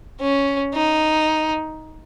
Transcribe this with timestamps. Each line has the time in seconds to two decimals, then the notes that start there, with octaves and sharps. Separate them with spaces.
0.21 C#4
0.75 D#4